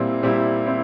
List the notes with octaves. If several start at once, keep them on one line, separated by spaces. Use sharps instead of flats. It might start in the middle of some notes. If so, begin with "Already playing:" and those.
Already playing: A#2 G3 C4 E4
A#2 G3 C4 E4
C4 E4